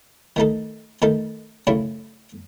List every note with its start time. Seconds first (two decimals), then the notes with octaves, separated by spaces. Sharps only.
0.36 D#3 A3 D#4 A4
1.02 D#3 A3 D#4 A4
1.67 F#2 C#3 F#3 A3 E4